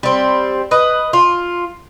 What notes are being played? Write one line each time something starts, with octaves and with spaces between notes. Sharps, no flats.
G3 C4
B4 D#5
F4